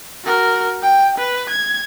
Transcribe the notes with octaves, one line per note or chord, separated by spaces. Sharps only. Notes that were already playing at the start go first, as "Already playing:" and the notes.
F#4 A#4
G5
B4
G#6